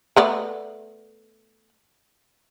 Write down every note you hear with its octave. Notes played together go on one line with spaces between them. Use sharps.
A3 B3 D5